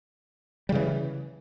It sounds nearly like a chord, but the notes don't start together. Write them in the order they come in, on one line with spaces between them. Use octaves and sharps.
G3 C#3 E3